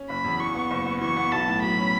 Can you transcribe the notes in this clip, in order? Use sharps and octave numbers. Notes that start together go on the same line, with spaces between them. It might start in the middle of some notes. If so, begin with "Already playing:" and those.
Already playing: C#4
F#1 B5
E2
E3 C#6
B3
F#1
B3
E3 C#6
B3
B1 A5
A2
F#3 B5
C#4